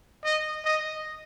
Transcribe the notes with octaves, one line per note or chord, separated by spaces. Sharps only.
D#5
D#5